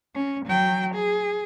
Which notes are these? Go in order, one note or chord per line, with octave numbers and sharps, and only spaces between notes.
C#4
F#3 G5
G#4